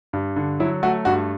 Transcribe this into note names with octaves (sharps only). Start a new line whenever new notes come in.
G2
D3
F#3 E4
A3 F#4
G2 F#4